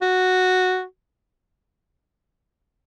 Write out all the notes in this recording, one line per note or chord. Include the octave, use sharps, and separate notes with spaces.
F#4